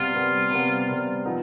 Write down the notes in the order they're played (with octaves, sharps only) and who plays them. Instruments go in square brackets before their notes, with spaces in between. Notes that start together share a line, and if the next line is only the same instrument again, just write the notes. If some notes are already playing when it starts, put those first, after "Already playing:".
Already playing: [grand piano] C3 G3 B3 [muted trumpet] F4
[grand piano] C3 G3 B3
C3 G3 B3
C3 G3 B3
F3 B3 D#4